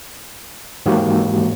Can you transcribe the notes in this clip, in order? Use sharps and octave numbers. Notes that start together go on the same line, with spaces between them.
G#2 D#3 E3 A#3 F#4 G4